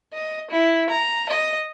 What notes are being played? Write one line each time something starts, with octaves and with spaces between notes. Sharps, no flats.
D#5
E4
A#5
D#5